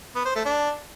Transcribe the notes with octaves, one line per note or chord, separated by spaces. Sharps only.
B3
C5
A3
D4